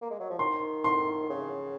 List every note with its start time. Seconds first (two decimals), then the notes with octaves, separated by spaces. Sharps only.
0.02 A#3
0.11 G#3
0.20 F#3
0.30 F3
0.39 D#3 C6
0.84 C6
1.30 C#3